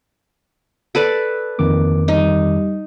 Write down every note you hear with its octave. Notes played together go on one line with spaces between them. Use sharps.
A4 B4 D5
F2 D#3 A#3 D6
G3 D#4